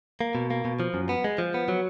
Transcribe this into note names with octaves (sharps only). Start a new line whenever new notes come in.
A#3
B2
A#3
B2
F3
F#2
B3
G#3
F3
B3
F#3